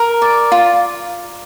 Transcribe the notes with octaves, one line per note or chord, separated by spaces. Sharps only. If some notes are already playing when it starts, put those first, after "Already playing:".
Already playing: A#4
D5
F4